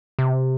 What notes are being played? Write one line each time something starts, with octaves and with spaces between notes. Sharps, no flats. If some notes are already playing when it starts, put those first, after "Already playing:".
C3